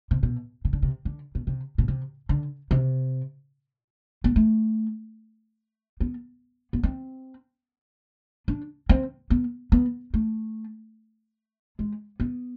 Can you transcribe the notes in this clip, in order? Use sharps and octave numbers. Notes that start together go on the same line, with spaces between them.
C3
B2
C3
D3
C3
D3
B2
C3
B2
C3
D3
C3
B3
A3
B3
B3
C4
D4
C4
B3
B3
A3
G#3
B3